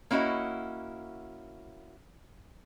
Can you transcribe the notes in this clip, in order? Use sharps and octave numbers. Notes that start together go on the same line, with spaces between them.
A#3 C#4 E4 F#4 D#5